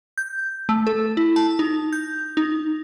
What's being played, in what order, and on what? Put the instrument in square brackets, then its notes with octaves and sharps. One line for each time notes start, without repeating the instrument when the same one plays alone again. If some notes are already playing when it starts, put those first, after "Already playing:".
[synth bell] G6
A3
A4
E4
A5
D#4
G6
D#4